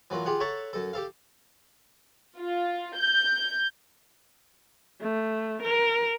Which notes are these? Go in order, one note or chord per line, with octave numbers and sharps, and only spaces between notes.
E3 F#3 A#3 F4
F4 G4 G#4 F#5
A4 C#5 E5 F#5 A5 A#5
F#2 A4
G4 A4 F5
F4
G6
A3
A#4